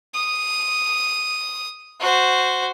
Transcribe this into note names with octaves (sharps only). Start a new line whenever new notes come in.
D#6
F#4 C5